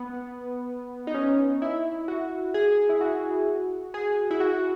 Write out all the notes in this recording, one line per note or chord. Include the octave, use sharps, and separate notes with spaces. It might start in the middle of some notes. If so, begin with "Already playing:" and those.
Already playing: B3
D#4
C#4
E4
F#4
G#4
E4
F#4
G#4
E4
F#4